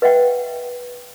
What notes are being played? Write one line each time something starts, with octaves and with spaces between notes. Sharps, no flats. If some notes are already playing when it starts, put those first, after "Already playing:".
B4 D#5 E5 F#5 G5